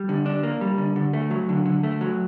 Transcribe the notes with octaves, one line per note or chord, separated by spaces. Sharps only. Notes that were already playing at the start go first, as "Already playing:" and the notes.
Already playing: G3
D3
D4
A#3
G3
D3
D3
A3
F#3
D3
D3
A3
F#3